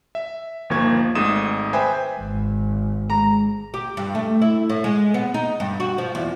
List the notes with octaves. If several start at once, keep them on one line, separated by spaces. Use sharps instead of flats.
E5
G1 D#2 F3 A#3 C#6 G#6
G#1 G#2 A3 D#6 E7
B4 C5 E5 G5 G#5 B5
G#1
G#3 A#5
G4
G2
A3
E4
A2
G#3
B3
D#4
G2
F#4
F3
E2